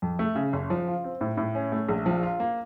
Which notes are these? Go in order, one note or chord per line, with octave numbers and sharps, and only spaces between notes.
F2
A3
C#3
F#1
F3
F4
C4
A2
A2
C#4
A3
A#1
F3
F4
A#3